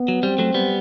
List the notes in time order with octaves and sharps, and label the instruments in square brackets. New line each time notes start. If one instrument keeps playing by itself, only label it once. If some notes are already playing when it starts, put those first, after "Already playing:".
Already playing: [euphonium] B3
[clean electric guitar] F#3
[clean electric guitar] G3 [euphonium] C4
[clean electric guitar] F#3 A3
G3 B3